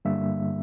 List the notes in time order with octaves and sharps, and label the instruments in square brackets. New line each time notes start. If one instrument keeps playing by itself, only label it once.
[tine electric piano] G2 D3 G3 A#3 E5